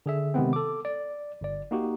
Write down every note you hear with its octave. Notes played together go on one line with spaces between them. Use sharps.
D3 G#4 E5
C3 D#3 G#3 B3 C4
A4 D6
D5
G1 D5
A#3 D#4 F#4 G4